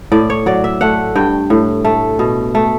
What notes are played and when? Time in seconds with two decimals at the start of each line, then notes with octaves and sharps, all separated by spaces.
0.12 A2 D5
0.30 C#5
0.46 F#3 D5
0.64 E5
0.81 A3 F#5
1.15 G2 G5
1.50 A2
1.85 A3
2.19 B2
2.55 A3